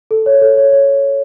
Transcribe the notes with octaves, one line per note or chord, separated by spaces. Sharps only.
A4
C#5
A4
C#5
C#5